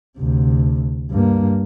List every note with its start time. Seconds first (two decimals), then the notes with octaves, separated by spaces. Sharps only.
0.18 D2 C3
1.11 G2 A#3